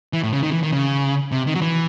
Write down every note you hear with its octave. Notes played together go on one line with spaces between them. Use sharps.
E3
A2
C#3
D#3
E3
D#3
C#3
C3
D#3
F#3
E3